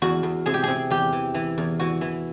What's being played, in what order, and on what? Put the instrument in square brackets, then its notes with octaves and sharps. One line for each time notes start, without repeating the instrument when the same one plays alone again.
[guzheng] E2 F#4
E2
C3 G#4
G4
C3 G#4
E2 G4
E3
E3
E2
E3 F#4
E3